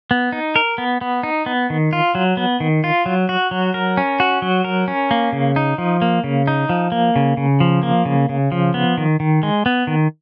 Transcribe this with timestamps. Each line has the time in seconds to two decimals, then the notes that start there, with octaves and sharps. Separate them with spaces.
0.11 B3
0.32 D#4
0.56 A#4
0.78 B3
1.01 B3
1.23 D#4
1.46 B3
1.70 D#3
1.93 F4
2.15 F#3
2.37 B3
2.60 D#3
2.84 F4
3.06 F#3
3.29 F#4
3.51 F#3
3.74 A#4
3.97 C#4
4.20 F#4
4.42 F#3
4.64 A#4
4.88 C#4
5.11 A#3
5.33 C#3
5.56 D#4
5.78 F3
6.02 A#3
6.24 C#3
6.47 D#4
6.69 F3
6.92 A#3
7.16 C#3
7.37 C#3
7.60 F3
7.83 A#3
8.05 C#3
8.29 C#3
8.52 F3
8.74 B3
8.98 D#3
9.20 D#3
9.43 G#3
9.66 B3
9.87 D#3